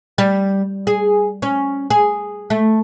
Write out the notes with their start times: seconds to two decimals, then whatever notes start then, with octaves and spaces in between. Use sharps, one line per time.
0.18 G3
0.87 G#4
1.42 C#4
1.90 G#4
2.50 A3